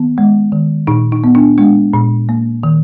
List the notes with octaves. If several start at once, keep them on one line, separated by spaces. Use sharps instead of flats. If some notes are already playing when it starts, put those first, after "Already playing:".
Already playing: D#3 B3
G#3
D#3
A#2 D#4
D#4
B3
D4
G#3 D4
A#2
A#3
D#3